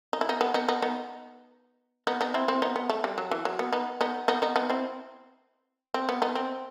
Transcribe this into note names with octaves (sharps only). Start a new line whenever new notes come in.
D#4
E4
B3 D#4
B3 D#4
B3 D#4
B3 D#4
B3 D#4
B3 D#4
B3 D#4
C4 E4
C4 E4
B3 D#4
B3
A3
G3
F#3
E3
F#3
B3
B3 D#4
B3 D#4
B3 D#4
B3 D#4
B3 D#4
C4 E4
C4
B3
B3 D#4
C4